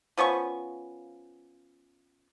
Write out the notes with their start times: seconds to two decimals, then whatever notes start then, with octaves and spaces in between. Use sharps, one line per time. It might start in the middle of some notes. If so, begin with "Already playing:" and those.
0.17 F3 B3 C#4 C#6